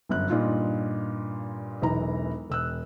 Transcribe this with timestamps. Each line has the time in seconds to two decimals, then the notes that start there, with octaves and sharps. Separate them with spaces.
0.09 G1 F#2 F#6
0.30 G2 A#2 D#4 F4
1.82 E1 B1 E3 A#5
2.49 E1 E6 F#6